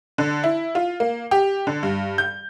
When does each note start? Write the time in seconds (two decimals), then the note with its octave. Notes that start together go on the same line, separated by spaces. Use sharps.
0.18 D3
0.44 E4
0.75 F4
1.00 A#3
1.31 G4
1.67 D3
1.83 G2
2.18 G6